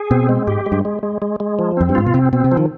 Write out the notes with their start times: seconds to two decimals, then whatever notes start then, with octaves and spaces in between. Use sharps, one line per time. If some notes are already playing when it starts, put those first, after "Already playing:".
Already playing: G#4
0.11 B2 C4
0.29 G#3
0.48 G#2 G4
0.66 G#3
0.72 G2
0.85 G#3
1.03 G#3
1.22 G#3
1.40 G#3
1.59 F3
1.77 F2 C4
1.89 G2
1.95 G#2 F4
2.06 B2
2.14 C3 C4
2.33 B2 C4
2.44 C3
2.52 F3
2.57 D#3